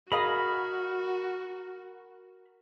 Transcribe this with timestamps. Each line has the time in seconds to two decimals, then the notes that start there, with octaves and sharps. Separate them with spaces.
0.12 F#4 G#4 A#4 D#5 F5 B5